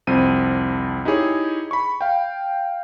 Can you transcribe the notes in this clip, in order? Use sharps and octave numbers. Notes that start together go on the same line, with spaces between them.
C2 F2 C4 D#7
D#4 E4 G4 G#4 C#5
B5 C#6
F5 G5